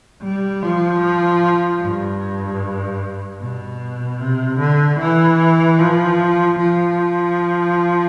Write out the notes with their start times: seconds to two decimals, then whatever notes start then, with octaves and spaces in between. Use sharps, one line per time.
0.23 G3
0.63 F3
1.82 G2
3.40 B2
4.20 C3
4.59 D3
4.99 E3
5.79 F3
6.58 F3